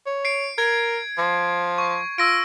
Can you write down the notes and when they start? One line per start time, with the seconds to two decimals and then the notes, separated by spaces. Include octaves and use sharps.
0.06 C#5
0.25 C7 D7
0.58 A#4 G#6
1.18 F3
1.78 C#6
2.18 F4 E6 A#6 D7